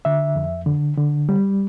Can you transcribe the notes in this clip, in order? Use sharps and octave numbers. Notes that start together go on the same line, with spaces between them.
D3 E5
F2
D3
D3
G3